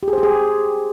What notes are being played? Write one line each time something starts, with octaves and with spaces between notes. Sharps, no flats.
G4
G#4
C5
G4
G#4